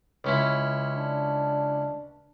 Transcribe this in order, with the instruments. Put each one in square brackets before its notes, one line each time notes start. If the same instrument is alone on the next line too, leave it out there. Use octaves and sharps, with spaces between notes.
[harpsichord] C#2 C#4 E4
[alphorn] D4